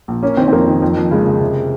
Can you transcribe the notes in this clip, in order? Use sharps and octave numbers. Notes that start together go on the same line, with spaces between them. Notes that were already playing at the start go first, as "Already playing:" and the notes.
A#1
A#3 C#4
D#3 C4
C4
F2 A#3
D#3
F2
F2
C#3 G#3
C#3
C3